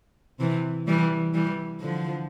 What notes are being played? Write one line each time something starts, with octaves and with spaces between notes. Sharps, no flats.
C3 E3
E3 G3
E3 G3
D3 F3